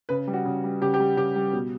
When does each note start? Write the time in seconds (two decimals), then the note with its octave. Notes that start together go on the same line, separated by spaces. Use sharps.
0.09 C#3 B4
0.27 G3
0.33 F#4
0.45 C#3
0.64 G3
0.81 C#3 G4
0.94 G4
1.00 G3
1.17 C#3 G4
1.36 G3
1.53 B2